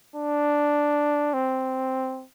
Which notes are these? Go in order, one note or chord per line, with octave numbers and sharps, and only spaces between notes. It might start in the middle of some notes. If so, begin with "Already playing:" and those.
D4
C4